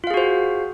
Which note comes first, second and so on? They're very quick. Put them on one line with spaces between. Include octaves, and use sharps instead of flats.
F4 F5 G#4 F#4 C5